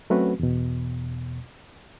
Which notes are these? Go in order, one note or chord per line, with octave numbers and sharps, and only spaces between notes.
F#3 A3 C4 C#4 F#4 B4
E2 B2